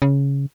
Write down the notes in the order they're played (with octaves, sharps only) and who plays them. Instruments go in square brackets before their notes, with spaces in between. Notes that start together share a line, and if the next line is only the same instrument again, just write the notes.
[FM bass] C#3